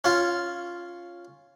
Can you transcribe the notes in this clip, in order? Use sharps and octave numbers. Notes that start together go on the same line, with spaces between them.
C#4 F4